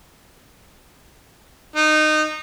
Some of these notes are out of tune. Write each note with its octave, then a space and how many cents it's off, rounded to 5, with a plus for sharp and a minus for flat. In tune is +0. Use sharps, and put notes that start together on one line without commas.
D#4 -20